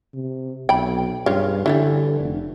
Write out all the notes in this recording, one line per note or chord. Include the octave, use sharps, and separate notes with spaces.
C3
B1 G5 B5
G2 C#3 F4
D3 E3 F3 G3
F1